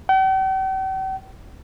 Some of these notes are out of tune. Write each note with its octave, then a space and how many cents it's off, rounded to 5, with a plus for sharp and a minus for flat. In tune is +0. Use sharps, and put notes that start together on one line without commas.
G5 -45